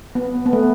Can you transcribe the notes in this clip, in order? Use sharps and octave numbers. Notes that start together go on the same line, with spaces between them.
B3
B3
A3